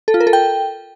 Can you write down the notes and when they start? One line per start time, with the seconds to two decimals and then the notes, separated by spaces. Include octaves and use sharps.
0.08 A4
0.14 F4
0.20 A#4
0.27 A4
0.33 G5